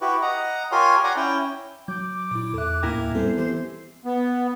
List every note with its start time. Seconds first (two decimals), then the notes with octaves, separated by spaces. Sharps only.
0.01 E4 F#4 G4 B4
0.22 D#5 F#5 A#5
0.72 F4 G4 A#4 C#5 G#5 C6
1.04 D5 F#5 G#5 A#5
1.16 C#4 E4 G5
1.88 F#3 D6 G6
2.31 A#2 E4
2.54 E2 A4 E5 F#6
2.83 D#2 A2 A#3 E4 A#4 G5 G#5
3.15 G3 B3 C4 A4 C5
3.37 E3 G4 C5
4.05 B3